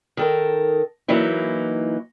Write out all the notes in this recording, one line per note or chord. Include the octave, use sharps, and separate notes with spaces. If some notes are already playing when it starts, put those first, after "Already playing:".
D#3 A4 A#4
E3 F#3 A#3 D#4 E4